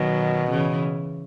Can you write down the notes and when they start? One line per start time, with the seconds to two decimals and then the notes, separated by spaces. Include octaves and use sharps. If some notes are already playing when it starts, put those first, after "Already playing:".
Already playing: B2 D#3 F#3
0.50 C#3 E3